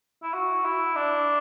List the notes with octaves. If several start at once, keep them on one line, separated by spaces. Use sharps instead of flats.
E4
F#4
E4
D4